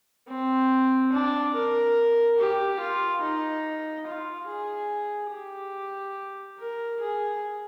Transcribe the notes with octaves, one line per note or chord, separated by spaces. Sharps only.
C4
D4
A#4
G4
F4
D#4
F4
G#4
G4
A#4
G#4